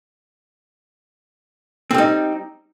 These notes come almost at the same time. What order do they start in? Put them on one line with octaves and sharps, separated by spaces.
C4 G3 D#4